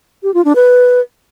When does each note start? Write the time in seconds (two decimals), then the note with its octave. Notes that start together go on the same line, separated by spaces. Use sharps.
0.23 G4
0.34 F4
0.45 D4
0.56 B4